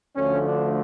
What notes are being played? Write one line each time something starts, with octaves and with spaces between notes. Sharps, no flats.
D2 D3 F3 A3 C#4
D4